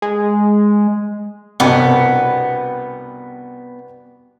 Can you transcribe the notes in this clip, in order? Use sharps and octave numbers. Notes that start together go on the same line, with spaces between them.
G#3
C2 G2 B2 B3